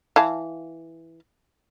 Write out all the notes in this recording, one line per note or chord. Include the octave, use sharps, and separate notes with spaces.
E3 F5 A5